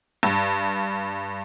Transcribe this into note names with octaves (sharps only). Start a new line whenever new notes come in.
G2